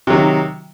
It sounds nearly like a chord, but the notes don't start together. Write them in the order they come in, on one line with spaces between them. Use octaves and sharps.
C3 F#3 D#3